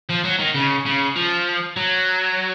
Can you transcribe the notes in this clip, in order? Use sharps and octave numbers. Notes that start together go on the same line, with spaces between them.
F3
F#3
D#3
C#3
C#3
F3
F#3